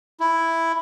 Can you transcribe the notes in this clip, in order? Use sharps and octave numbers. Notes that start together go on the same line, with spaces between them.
E4